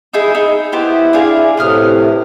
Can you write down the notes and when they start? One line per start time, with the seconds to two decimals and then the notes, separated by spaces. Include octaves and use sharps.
0.13 D#4 E4 G#4
0.35 D#4
0.72 B3 E4 G4 C5
1.13 D4 G#4 F5
1.57 A2 C3 B4 D#6 F6